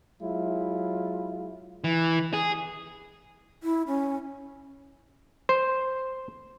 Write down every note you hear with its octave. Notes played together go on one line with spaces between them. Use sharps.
F#3 G#3 E4 F4
E3
G#4
E4
C#4
C5